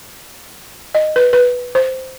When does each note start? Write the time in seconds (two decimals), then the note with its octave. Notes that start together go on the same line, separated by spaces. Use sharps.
0.95 D#5
1.16 B4
1.33 B4
1.75 C5